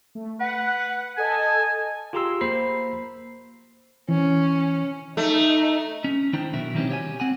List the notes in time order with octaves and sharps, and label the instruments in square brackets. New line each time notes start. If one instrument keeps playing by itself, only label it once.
[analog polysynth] A3
[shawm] B4 [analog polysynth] F#5
[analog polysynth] A4 D#5 A5 [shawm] G#5
[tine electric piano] F4 G4 G#4 A#5 C6 E6
A#3 C5 A#5 B5 C7
[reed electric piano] E3 [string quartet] C#4
[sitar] A3 [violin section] D#4
[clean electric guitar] C#4
D#3 D4 E4 C5 G5 A#5
B1 B2 F#3 A#4 E5
D#3 E3 G3 A3 C4 C#4
G4 C#5 E5 G#5
C4 F#5 G#5